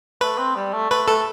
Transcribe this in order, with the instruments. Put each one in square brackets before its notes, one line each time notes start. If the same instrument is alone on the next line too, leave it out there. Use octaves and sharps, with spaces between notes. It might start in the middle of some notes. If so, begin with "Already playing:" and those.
[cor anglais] A3 [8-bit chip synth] B4
[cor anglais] C4
G3
A3
[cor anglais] A3 [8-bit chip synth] B4
[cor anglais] A3 [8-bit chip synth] A4